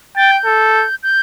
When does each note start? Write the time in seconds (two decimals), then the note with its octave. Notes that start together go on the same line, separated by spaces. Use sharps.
0.16 G5 A6
0.31 G6
0.46 A4
1.03 G6